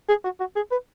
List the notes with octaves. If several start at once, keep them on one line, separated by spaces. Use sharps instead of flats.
G#4
F#4
F#4
G#4
B4